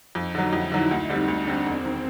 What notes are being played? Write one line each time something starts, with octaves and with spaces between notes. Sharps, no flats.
F2 D#4
D3 F#3
F2 E4
D3 F#3
D2 D#4
D3 G3 C4
D2 D4
D3 G3 C4
E1 C4
D#3